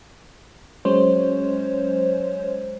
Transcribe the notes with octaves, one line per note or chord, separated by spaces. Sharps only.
F#3 G#3 C#4 C5 C#5